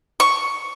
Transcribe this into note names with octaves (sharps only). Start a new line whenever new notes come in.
C#6